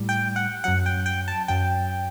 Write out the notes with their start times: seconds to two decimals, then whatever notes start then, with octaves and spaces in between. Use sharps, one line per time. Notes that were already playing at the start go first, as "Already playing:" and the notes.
Already playing: A2 G3
0.09 G5
0.36 F#5
0.64 F#2 F#3 F#5
0.86 G5
1.06 G5
1.28 A5
1.48 F#2 F#3 G5